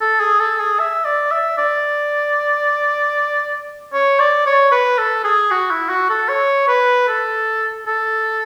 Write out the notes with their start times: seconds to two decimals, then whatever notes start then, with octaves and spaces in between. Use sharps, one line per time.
0.01 A4
0.20 G#4
0.40 A4
0.59 G#4
0.79 E5
1.05 D5
1.31 E5
1.58 D5
3.93 C#5
4.19 D5
4.46 C#5
4.71 B4
4.98 A4
5.24 G#4
5.51 F#4
5.70 E4
5.89 F#4
6.09 A4
6.29 C#5
6.68 B4
7.08 A4
7.86 A4